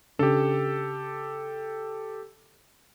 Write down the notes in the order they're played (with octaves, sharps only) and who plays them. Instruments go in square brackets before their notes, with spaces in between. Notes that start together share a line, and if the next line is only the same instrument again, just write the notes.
[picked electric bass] C#3 C#4 D4 [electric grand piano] G4 A4